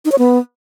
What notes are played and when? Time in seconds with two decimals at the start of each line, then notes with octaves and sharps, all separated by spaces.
0.05 D#4
0.12 C#5
0.18 B3